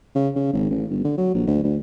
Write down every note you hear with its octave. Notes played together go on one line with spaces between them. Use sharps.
C#3
C#3
G#1
A1
G1
D3
F#3
A#1
D2
D2